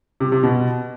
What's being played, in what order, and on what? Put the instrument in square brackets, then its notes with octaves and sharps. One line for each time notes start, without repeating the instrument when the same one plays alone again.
[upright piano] C3
C3
B2